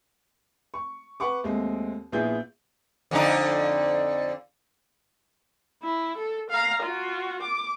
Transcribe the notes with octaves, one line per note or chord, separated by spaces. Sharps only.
C#6
B4 F#5 C#6 D6
D#2 G#3 A3 C4
A#1 B3 E4 F4 G#4 G6
F2 D3 D#4
E4
A4
F5 A#5
F4 F#4
D6